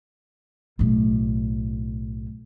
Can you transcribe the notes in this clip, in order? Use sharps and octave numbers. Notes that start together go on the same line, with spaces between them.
B1 A2